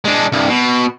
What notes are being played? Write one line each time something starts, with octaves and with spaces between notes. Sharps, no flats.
G#3 D4
C2 G2
B2